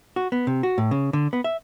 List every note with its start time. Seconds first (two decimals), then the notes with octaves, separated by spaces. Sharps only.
0.16 F#4
0.32 B3
0.47 C3
0.63 F#4
0.78 A2
0.91 C#3
1.13 D3
1.33 B3
1.44 E5